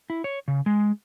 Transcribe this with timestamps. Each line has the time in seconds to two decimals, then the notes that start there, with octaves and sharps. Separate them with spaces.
0.10 E4
0.24 C#5
0.48 C#3
0.66 G#3